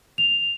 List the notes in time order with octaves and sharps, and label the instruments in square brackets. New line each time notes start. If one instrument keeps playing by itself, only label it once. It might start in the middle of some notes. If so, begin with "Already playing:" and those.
[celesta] F7